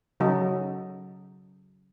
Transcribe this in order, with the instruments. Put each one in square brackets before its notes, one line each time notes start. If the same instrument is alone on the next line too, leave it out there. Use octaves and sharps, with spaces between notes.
[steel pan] C#3 F#3 D#4 A4